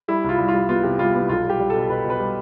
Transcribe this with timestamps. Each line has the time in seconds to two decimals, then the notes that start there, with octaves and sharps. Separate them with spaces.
0.08 G3 E4
0.24 C2 F4
0.38 C2
0.48 F4
0.54 G3
0.69 B3 F4
0.83 C3
0.99 G3 F4
1.14 B3
1.29 B1 F4
1.44 G3
1.49 G4
1.59 G3
1.70 B2 A4
1.89 B2 B4
2.05 B2 B4
2.20 G3